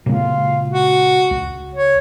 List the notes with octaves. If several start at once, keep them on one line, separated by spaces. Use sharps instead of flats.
A#2 C#3 G#3 F4
F#4
C#2
C#5